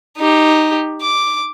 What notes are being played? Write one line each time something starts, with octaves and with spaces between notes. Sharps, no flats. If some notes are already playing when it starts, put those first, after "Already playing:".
D#4 G4
D6